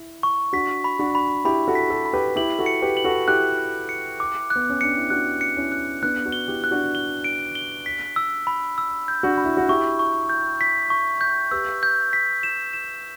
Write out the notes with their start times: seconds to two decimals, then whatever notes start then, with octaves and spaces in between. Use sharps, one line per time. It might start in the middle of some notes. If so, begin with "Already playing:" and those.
Already playing: E4
0.23 C#6
0.53 D4 F#4 B6
0.84 B5
0.99 D4 F#4
1.15 B5
1.45 E4 G4 B5
1.68 F#4 A4
1.75 B6
1.90 F#4 A4
2.06 B5
2.13 G4 B4
2.36 E4 G4 F#7
2.59 F#4 A4
2.66 C#7
2.82 G4 B4
2.97 F#7
3.04 F#4 A4
3.28 E4 G4 F#6
3.58 F#6
3.89 C#7
4.20 D6
4.50 F#6
4.56 B3
4.69 C#4
4.81 D4 C#7
4.97 E4
5.10 D4 F#4 F#6
5.41 C#7
5.57 C#4 E4
5.72 F#6
6.03 B3 D4 F#6
6.25 D4 F#4
6.32 G7
6.48 E4 G4
6.64 F#6
6.71 D4 F#4
6.95 G7
7.24 D7
7.55 G7
7.86 B6
8.16 E6
8.47 B5
8.78 E6
9.08 G6
9.23 D4 F#4
9.38 B5
9.45 E4
9.57 F#4
9.69 E4 G4 C#6
9.99 C#6
10.29 G6
10.61 B6
10.90 C#6
11.21 G6
11.51 G4 B4 E6
11.83 G6
12.13 B6
12.43 E7
12.73 E7